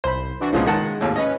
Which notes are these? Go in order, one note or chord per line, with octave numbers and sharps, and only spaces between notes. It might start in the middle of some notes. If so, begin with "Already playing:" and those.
C2 C5 B5
E3 D4 F#4
C2 A#2 C#3 F3 G#3 B3
D#3 G#3 F#5 A5
G#1 D#2 A2
C#4 B4 D#5